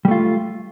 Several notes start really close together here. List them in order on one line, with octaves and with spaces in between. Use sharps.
G3 A3 F4